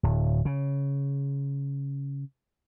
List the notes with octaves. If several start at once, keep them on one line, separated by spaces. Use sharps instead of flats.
D1
C#3